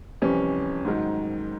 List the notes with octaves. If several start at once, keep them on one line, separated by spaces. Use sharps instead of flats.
F2 C3 E3 G3 C#4
G#2 D#3 F#3